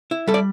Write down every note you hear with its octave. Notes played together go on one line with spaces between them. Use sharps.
E4
G3 A4
D5